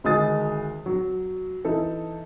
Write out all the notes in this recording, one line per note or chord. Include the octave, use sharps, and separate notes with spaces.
D2 D#3 G#3 D#6 A6
F#3
E3 D#4 A4